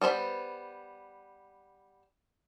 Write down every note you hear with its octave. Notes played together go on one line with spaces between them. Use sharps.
G3 B3 C5 B5